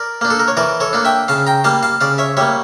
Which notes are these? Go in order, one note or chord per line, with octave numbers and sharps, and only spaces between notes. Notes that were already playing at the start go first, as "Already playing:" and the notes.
Already playing: A#4 D5
A#3 D4
A4
A#4
C#5
E3 A#4 D5
A4 C#5
A#3 D4
E5 G5
C#3 F5 A5
G5 A#5
G3 A#3 F5 A5
F5 A5
C#3 D5 F5
C#5 E5
G3 A#3 C#5 E5